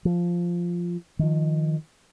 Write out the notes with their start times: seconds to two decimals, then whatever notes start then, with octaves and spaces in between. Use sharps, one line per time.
0.05 F3
1.19 D#3 F3